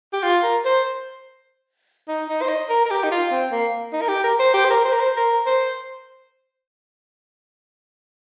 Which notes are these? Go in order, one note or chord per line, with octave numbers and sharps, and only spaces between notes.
G4
F4
A#4
C5
D#4
D#4
C5
D#5
A#4
A#4
G4
D#4
F4
C4
A#3
D#4
A#4
G4
A#4
C5
G4
C5
A#4
C5
A#4
C5
A#4
C5